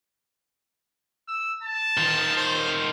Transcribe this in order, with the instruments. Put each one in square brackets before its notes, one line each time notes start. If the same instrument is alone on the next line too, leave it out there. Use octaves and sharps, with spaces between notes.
[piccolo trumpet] E6
A5
[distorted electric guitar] D#3 F4
[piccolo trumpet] C5